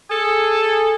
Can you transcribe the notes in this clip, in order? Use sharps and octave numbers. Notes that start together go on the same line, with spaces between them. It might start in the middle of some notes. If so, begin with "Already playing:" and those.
G#4 A4